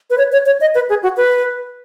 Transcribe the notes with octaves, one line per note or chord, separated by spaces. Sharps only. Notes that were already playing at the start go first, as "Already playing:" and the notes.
B4
C#5
C#5
C#5
D#5
B4
G#4
F#4
B4